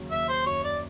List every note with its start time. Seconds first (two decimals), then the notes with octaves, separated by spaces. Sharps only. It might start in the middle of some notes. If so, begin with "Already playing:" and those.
Already playing: D#2 C#3 F#3
0.11 D#2 E5
0.29 C5
0.46 F#2 C#5
0.64 D5